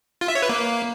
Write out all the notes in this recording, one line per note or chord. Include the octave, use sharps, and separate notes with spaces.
F4
E5
C#5
B4
A#3